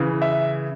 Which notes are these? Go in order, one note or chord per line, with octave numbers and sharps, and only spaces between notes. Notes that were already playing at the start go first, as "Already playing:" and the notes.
Already playing: C#3 E3
E5